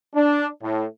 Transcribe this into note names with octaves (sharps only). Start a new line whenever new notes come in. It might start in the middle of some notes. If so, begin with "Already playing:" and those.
D4
A2